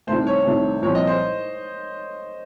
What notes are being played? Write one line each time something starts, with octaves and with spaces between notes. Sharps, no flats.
C2 C3 D#3 A3 C5
C#5
C2 C3 D#3 A3
C2 A#2 F3 C4 C#5
D#5
C5